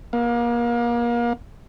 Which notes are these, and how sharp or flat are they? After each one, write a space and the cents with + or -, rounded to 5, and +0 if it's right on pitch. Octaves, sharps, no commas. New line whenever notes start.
A#3 +35 F5 +30